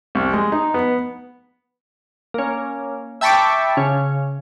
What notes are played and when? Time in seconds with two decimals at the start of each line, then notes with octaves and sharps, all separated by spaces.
0.15 C2
0.33 G#3
0.52 D#4
0.74 B3
2.34 A#3 C#4
3.21 E5 G5 A5 B5 C#6 D6
3.77 C#3 C#4